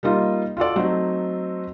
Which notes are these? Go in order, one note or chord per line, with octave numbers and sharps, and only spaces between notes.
G3 A#3 D#4 F4
F4 F#4 A4 D5
F#3 A3 C4 D#4 F#4